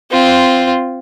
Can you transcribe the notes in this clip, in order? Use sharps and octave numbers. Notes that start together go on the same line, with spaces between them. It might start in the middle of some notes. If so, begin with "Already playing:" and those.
C4 F4